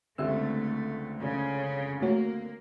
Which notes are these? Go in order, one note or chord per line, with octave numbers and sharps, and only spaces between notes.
C#2 D3 A3 C4 G4 E5 E6
C#3
A3 A#3 F#4 C#5